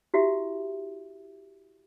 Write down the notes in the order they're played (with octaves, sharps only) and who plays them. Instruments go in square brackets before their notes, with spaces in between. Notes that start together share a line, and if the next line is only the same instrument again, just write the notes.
[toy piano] E4 F#4 G4 E5